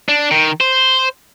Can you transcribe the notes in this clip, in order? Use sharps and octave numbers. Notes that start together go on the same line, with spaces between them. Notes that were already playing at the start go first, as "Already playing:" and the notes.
D4
D#3
C5